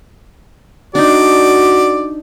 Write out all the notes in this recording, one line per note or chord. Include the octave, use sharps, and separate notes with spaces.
D4 D#4 F#4 D5